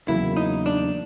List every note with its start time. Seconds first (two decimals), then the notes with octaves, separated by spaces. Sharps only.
0.08 E2 C#3 F#3 A#3 E4
0.36 D#4
0.66 D4